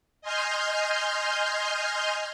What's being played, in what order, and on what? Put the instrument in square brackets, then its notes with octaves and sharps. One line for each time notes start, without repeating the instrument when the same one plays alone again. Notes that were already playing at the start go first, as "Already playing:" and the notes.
[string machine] D#5 G#5 C6 F6 G6